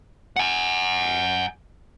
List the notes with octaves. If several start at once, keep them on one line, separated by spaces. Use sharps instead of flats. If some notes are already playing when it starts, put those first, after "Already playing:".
F#5 G#5